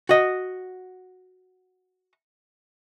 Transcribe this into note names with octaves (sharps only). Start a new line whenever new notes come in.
F#4 D#5